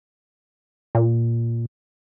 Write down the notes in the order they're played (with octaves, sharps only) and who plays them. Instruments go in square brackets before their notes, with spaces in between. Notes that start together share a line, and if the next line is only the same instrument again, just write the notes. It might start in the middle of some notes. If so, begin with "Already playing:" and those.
[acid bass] A#2